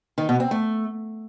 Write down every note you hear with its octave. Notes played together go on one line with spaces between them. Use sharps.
D#3
B2
C4
A3